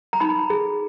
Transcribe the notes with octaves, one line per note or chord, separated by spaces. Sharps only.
A#5
D#4 B5
G#4